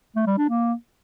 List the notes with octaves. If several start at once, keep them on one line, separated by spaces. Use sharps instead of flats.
A3
G3
D4
A#3